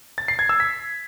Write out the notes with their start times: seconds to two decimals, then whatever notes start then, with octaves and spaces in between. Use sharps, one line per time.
0.18 A6
0.28 C7
0.39 G#6
0.49 E6
0.60 B6